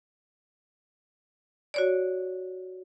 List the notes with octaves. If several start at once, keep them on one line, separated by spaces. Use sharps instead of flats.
F#4 C#5 D5